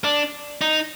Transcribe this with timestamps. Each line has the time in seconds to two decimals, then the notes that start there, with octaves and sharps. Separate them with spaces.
0.04 D4
0.61 D#4